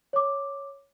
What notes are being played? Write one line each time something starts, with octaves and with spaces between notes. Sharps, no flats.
C#5 D6